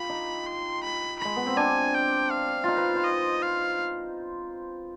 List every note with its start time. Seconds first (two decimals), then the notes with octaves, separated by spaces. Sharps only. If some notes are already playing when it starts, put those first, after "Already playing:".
Already playing: F4 G4 B5
0.10 D#4
0.47 C6
0.84 B5
1.20 B5
1.25 G#3
1.36 B3
1.47 C4
1.56 D4 G#5
1.95 G5
2.31 F5
2.64 D#4 F4
2.77 B4
2.95 C5
3.04 D#5
3.42 F5